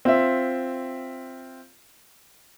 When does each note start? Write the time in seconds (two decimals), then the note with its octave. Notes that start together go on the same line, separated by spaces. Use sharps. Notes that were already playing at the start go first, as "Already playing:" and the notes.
0.05 C4 F4 E5